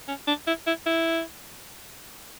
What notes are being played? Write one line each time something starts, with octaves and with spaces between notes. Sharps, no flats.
C#4
D4
E4
E4
E4